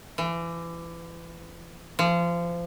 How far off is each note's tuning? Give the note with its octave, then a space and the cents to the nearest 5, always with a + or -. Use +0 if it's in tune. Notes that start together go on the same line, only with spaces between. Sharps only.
E3 +30
F3 -25